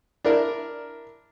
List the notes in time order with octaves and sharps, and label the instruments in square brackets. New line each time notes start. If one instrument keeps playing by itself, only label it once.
[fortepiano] D4 E4 A#4